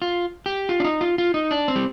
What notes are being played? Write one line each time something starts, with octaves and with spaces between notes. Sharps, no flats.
F4
G4
F4
D4
D#4
F4
F4
D#4
D4
C4
G3